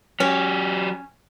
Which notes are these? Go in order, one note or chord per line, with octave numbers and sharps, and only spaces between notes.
F#3 C#4 G4